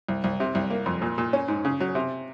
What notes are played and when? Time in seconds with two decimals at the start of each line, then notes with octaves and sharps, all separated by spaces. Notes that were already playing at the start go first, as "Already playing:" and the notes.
0.09 C2
0.24 C2
0.40 C3
0.55 C2
0.70 A#3
0.86 F2
1.02 A#2
1.18 A#2
1.33 C#4
1.48 G#2
1.65 C#3
1.80 F#3
1.95 C3